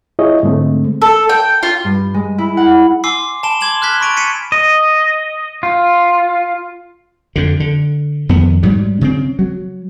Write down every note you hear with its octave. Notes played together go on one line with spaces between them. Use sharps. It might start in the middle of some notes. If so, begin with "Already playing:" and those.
E4 F4 G#4 C#5 D#5
G#2 D3 G#3 A3 C4
A4
G5
F4
G2
G#3
E4
F#5
G#5 C6 D6 E6 C7
G#5 A5 B5 D7 E7 G7
C6 D6 G#6 E7 F#7 G7
F6 F#6 G#6 B6 G7
B5 C#6 A6 D7 D#7 F7
G#6 B6 C#7 D#7
D#5
F4
F2 D3
D3
F2 D#3 B3
G#2 F#3 G3
C#3 C4
F#3